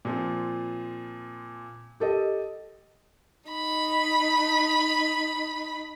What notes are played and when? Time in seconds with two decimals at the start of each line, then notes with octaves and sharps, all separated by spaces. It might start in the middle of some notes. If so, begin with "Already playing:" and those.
0.05 A#2 F3 C4
2.00 G4 A4 D#5
3.49 D#4 B5